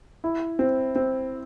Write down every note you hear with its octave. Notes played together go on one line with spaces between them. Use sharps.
E4
C4
C4